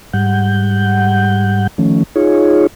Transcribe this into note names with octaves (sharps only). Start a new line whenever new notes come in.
G#2 G3 F#5 G6
D#3 F3 A3 C#4
D#4 F4 G#4 C#5